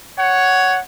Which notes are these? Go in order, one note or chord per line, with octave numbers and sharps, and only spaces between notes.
C#5 F#5